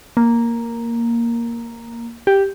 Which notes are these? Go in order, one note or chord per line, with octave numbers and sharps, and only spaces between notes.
A#3
G4